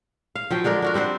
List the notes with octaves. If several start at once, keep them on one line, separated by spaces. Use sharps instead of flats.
F5
F3 F#3 G5
D3 G#3 D4 A#4
D4 F#4 A#4
G3 C4 D4 C5